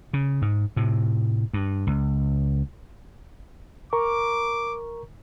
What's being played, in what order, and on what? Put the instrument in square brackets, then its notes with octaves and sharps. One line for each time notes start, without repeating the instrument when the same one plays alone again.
[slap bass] C#3
G#2
A2 C3
G2
C#2
[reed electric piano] A#4 A#5 C#6 [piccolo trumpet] D6